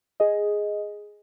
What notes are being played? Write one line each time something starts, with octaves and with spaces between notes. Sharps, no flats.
G#4 D#5